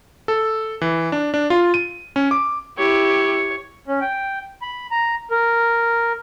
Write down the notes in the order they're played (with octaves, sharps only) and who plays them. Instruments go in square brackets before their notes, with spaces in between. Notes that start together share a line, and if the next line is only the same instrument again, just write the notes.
[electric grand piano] A4
E3
D4
D4
F4
D#7
C#4
D6
[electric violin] E4 G4 [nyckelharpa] C#5
[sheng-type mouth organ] C#4
G5
B5
A#5
A#4